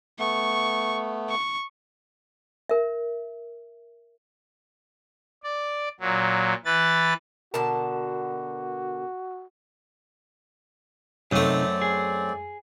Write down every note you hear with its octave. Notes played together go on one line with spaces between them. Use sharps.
A3 B3 C#6
C#6
A#4 E5
D5
A#2 F#3
E3 B4 A6
B2 D3 F#4 A#4 A5
F#2 C3 A3 C4 D#4 D5
G#4